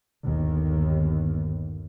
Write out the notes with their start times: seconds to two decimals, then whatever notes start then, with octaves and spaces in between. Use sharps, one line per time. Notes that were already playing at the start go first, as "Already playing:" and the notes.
0.24 G1 D#2